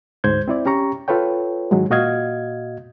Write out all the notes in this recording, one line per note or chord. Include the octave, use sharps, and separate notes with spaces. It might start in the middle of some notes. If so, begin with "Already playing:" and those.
D2 G#2 C5 G6 G#6
C4 E4 D5
C#4 G4 A#5 C#6
F4 A4 B4 C#5 G5
G#2 D#3 F#3 G#3
A#2 F#4 D#5 F5 G#6